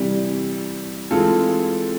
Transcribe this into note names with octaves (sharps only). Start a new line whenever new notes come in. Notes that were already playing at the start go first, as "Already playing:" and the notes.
Already playing: C3 E3 G3
E3 G#3 C4 F4 A4